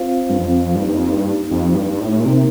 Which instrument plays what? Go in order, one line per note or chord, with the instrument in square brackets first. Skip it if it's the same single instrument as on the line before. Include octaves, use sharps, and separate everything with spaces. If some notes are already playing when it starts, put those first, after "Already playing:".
Already playing: [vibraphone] C4 F4 C5 F5
[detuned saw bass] G2
F2
[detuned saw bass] G2 [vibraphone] A#3 D#4 G4
[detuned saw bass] G2
F2
G2
F2
G2
A2
A#2
[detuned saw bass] C3 [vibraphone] A#3 D#4 A#4